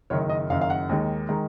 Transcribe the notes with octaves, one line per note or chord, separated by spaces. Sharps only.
F#1 F#2 D#3 C#5
D#5
F#1 F#2 D#3 F5
F5
F#5
D#2 D#3 G#3
D#3 G#3 A#5